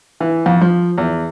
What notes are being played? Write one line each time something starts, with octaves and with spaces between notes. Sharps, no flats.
E3
F2
F3
E2